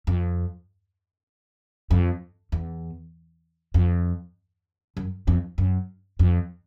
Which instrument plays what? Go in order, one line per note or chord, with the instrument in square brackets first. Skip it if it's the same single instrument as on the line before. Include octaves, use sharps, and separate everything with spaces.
[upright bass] F2
F2
E2
F2
F#2
F2
F#2
F2